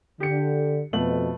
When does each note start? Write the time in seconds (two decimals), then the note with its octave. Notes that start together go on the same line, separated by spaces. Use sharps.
0.20 D3 G4 C#7
0.93 F2 B2 A3 B3 F#7